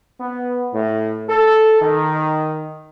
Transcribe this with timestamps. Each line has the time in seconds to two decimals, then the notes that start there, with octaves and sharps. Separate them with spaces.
0.20 B3
0.73 A2
1.29 A4
1.82 D#3